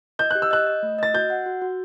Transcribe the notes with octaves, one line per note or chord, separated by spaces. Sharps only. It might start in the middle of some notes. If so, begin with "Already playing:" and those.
D#5 G6
G4 F#6
E6
D#5 F#6
D#5
A3
D#5 A6
F#4 G6
F#5
F#4
F#4